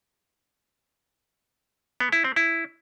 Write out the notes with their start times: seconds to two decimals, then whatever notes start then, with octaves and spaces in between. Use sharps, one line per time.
2.00 B3
2.12 E4
2.24 C4
2.36 E4